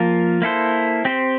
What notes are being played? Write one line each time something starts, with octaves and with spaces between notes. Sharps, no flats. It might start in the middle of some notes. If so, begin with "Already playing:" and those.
Already playing: F3 A#3 F4 A#4
A#3 E4 A4 C5
C4 G4 C5